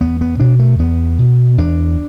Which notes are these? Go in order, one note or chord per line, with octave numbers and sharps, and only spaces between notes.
E2 B3
B3
B2 D4
A3
E2 B3
B2
E2 D4